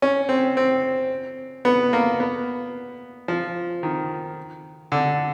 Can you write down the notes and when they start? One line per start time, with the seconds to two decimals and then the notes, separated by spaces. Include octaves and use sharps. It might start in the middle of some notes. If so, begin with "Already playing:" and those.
0.02 C#4
0.29 C4
0.57 C4
1.65 B3
1.93 A#3
2.20 B3
3.28 F3
3.83 D#3
4.92 D3